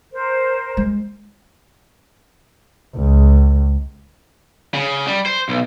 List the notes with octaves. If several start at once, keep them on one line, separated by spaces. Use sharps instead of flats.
A#4 C5
G#3
C#2
C#3
G3
C5
B1